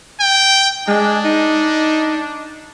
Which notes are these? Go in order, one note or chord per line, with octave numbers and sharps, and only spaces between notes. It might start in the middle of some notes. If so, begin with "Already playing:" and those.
G5
G#3 D4
D#4